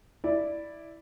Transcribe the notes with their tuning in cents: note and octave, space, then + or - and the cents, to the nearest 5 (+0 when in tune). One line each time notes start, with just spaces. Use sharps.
E4 -5 D5 +0